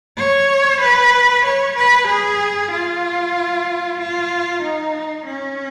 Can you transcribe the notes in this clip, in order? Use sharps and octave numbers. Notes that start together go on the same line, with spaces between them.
C#5
B4
C#5
B4
G#4
F4
F4
D#4
C#4